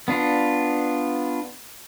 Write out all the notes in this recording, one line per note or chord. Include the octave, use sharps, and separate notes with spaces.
B3 D4 F4